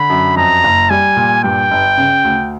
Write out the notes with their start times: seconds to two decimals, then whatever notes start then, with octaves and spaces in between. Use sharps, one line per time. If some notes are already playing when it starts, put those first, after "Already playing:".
Already playing: D3 B5
0.10 F#2
0.37 F2 A#5
0.64 F#1
0.90 G3 G#5
1.16 A#2
1.44 G2 G5
1.71 G1
1.97 C#3
2.24 D2